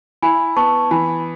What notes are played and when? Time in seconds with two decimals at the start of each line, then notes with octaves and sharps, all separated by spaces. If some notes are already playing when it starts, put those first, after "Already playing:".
0.22 E4 G#5 B5
0.56 B3 A5 C#6
0.91 E3 G#5 B5